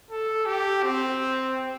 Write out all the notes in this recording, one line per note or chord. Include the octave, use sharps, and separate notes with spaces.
A4
G4
C4